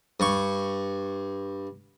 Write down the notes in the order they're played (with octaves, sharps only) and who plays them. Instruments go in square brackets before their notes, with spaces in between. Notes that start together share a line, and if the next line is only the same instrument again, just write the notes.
[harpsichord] G2 C#6